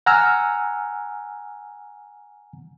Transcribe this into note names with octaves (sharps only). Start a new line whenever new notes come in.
F#5 G#5 A#5 E6 F6